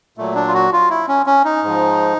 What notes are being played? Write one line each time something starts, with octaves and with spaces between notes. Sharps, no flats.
A#2 F#3 A3
D4
F4
F#4
F4
E4
C#4
C#4
D#4
G#2 F3